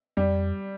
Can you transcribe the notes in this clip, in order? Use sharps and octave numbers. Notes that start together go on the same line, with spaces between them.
F2 G3